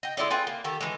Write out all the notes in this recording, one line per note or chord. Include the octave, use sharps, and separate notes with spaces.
D#5 G5
G#3 E4 D5 D#5
F4 G#4 B4 G5
A#3
D#3 G4 A4
E3 G#3